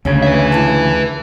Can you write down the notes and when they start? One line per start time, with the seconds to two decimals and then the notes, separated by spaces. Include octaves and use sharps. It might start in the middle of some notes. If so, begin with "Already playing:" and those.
0.05 D2 C#3 C#4
0.23 B4 E5
0.52 E3 A5